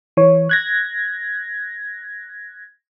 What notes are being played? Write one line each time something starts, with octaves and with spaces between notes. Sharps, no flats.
E3 C#5
F#6 G#6 A#6